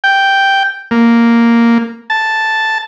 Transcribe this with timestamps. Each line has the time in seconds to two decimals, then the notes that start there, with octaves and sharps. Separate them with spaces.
0.04 G5
0.91 A#3
2.10 A5